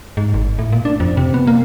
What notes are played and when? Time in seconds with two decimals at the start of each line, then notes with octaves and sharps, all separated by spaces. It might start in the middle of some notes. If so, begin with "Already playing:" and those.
0.17 G#2
0.34 G#1
0.59 A2
0.72 A#2
0.85 D4
1.00 F2
1.17 C3
1.34 B3
1.47 A#3